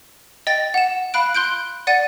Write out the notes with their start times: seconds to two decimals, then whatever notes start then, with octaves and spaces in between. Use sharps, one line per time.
0.47 D#5 G5 A6 A#6
0.74 F#5 E7
1.14 F5 B5 F#6 D7
1.34 C6 F#6 G6 D7
1.87 D5 F#5 A6 D#7